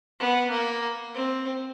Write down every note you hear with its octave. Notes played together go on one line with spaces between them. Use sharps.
B3
A#3
C4